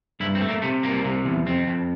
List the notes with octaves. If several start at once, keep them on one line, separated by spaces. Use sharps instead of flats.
G2 E4
C4
A3
A#3
C3 A3
C2 A#3
C3
E2
F2 C4
F2